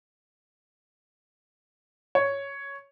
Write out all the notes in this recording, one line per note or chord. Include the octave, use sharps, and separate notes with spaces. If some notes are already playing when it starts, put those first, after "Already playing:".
C#5